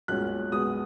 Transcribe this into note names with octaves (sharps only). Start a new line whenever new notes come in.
B1 A#2 G#3 C#4 F#6
B1 B2 G#3 B3 D#6